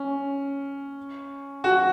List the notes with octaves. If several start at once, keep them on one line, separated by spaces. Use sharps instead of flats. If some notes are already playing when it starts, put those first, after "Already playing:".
Already playing: C#4
F#4